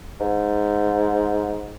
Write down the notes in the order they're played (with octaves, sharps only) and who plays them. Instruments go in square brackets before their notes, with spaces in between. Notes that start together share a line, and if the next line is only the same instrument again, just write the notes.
[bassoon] G#2